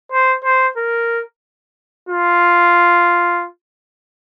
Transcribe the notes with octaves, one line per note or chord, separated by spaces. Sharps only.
C5
C5
A#4
F4